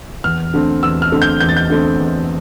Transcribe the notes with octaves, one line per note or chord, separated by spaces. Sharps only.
E2 F6
D3 A3 C4
E2 E6
F6
D3 A3 C4
G6
E2 G6
A6
G6
D3 A3 C4
E2